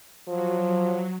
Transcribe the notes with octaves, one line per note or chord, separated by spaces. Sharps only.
F3 F#3